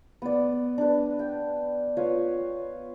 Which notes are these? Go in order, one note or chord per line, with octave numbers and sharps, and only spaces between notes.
B3 D5
D4 B4
G5
F4 B4 C#5